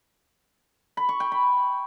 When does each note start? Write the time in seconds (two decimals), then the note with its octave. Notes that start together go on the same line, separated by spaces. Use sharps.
0.97 B5
1.09 C#6
1.20 G5
1.32 B5